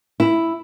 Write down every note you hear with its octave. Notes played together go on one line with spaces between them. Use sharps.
E4